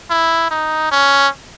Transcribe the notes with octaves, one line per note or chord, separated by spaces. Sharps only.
E4
D#4
C#4